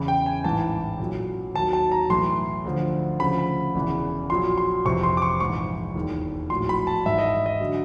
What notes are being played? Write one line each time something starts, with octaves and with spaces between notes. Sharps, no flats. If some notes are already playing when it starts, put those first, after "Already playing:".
Already playing: E2 C#3 E3
G5
G#5
A1 G#2 E3 A5
B1 A#2 F#3
D#2 D#3 F#3 A5
A5
A#5
B1 A2 E3 C6
D2 D3 F3
D2 C#3 F3 B5
E1 E2 C#3 E3
A#1 A#2 F#3 C6
C6
F1 F2 C3 E3 C#6
C6
D6
C#6
A#1 G#2 E3 C#6
E1 D#2 D#3
A#1 A2 F#3 C6
B5
A5
G#1 G#2 E3 E5
D#5
D#5
D3 F#3